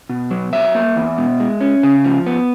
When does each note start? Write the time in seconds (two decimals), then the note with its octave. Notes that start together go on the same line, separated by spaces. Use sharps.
0.09 B2
0.31 F#3
0.53 F#3 E5
0.75 A#3
0.96 E2
1.18 B2
1.40 G#3
1.61 C#4
1.83 C#3
2.04 F3
2.26 B3